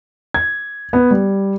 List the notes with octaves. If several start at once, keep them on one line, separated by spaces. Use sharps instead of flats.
G#6
B3
G3